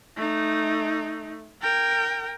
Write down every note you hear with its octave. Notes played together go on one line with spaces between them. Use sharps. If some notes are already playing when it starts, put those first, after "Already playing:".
A3 D#4
A#4 G5